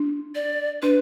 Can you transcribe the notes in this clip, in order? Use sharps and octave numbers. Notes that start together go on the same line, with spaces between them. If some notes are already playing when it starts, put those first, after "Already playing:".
Already playing: D4
D5
D4 B4